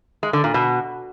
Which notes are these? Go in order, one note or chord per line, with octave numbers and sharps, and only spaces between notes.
G#3
D3
A#2
B2